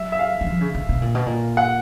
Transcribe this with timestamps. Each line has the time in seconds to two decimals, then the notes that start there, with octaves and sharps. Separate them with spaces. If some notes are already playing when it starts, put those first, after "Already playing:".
Already playing: F#3 E5
0.12 E5
0.19 F5
0.41 E3
0.47 F3
0.61 C#3
0.74 C#3
0.89 B2
1.02 A#2
1.15 B2
1.26 A#2
1.57 F#5